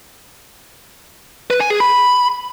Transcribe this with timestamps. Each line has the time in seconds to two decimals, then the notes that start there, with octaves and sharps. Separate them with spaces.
1.50 B4
1.60 G#5
1.70 G#4
1.80 B5